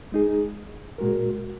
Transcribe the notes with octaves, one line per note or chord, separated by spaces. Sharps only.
G#3 D#4 G#4
A#2 G#3 F#4 A#4